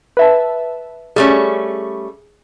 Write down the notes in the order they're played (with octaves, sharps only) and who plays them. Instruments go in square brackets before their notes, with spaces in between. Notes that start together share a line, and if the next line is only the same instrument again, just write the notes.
[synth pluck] B4 E5 A5
[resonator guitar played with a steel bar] G3 A3 C#4 [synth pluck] G#4